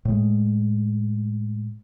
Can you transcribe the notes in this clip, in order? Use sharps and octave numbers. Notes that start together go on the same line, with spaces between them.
A2 G#3